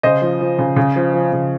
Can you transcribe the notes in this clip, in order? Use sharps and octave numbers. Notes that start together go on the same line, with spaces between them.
C#3 C5 D#5
F3
F3
C#3
C#3
F3
F3
C#3